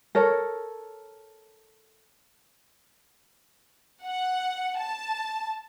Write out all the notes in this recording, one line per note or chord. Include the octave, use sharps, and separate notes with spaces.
A4 A#4 C#5
F#5
A5